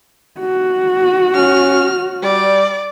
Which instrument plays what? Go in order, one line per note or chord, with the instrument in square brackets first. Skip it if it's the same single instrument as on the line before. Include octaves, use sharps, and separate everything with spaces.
[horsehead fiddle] F#4
[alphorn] C#4 [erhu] F6
[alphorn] G3 [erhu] D5